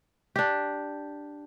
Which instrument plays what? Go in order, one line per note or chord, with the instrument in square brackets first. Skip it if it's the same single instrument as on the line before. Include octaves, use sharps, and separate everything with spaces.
[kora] D4 G4